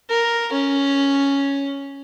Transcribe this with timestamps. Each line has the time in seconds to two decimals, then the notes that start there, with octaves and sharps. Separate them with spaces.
0.10 A#4
0.52 C#4